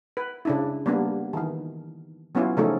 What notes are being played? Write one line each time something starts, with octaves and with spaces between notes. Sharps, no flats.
B4
C#3 D4 E4
G3 A#3 B3 D4 G4
D#3 E3
F#3 B3 C#4 E4 F4
C#3 F3 A3 C#4 D#4 A4